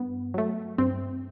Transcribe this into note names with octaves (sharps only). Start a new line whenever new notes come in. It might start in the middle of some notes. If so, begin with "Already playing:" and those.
Already playing: G2 B3
F#3 A3
G2 C4